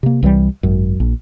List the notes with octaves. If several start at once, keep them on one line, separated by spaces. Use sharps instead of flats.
C3 A#3
C2 E3 F3 G3
G#1 F#2
A#1